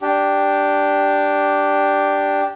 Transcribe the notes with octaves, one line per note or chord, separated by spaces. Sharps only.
D4 G4